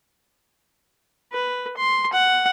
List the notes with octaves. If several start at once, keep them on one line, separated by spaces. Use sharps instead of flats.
B4
C6
F#5